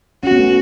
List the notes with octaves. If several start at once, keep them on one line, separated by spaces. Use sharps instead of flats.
C#4 F#4
B3
A3